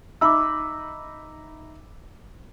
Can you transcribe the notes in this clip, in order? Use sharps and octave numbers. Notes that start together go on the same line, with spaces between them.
D#4 E5 B5 D6 E6